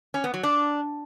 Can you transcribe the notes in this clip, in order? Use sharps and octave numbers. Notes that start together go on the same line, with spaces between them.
C#4
B3
F#3
D4